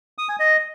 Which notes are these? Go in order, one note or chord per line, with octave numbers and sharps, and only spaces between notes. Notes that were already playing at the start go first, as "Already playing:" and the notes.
D#6
G#5
D#5